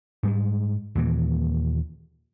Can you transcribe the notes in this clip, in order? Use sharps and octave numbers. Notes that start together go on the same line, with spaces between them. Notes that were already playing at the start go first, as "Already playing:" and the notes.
G#2 G3 G#3
D#2 A#2 E3